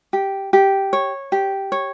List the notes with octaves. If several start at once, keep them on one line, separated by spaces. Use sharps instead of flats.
G4
G4
C#5
G4
C#5